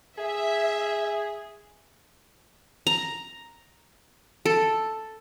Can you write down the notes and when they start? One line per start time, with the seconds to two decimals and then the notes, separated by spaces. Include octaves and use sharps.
0.18 G#4 E5
2.87 A#5
4.46 A4